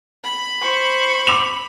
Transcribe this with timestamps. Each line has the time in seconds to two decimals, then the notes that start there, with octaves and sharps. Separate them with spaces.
0.24 B5
0.61 C5 C#6
1.27 D6 F7